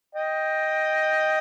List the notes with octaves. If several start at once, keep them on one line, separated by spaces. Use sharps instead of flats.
D#5 G5